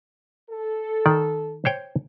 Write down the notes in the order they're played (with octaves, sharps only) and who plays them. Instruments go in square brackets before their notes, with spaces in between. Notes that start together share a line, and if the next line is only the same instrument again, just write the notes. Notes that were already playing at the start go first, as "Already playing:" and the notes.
[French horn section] A4
[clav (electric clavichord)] D#3 D5
C5 C#5 G5